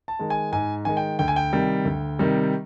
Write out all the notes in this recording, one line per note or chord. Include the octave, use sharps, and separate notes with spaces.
A5
D#3 G#3
G#5
G#2 G#5
D#3 G#3 G#5
G5
D2 G5
G#5
G5
C3 D#3 G3
D2
C3 D#3 G3